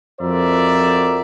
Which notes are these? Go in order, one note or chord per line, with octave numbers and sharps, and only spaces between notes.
F2 F#4 A#4 C5 D5 E5